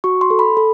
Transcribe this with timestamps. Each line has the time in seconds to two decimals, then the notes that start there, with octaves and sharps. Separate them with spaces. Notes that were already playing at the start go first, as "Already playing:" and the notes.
0.04 F#4 C#6
0.21 C6
0.30 A4
0.39 B5
0.57 A4